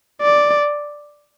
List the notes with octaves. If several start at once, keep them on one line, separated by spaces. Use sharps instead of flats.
D5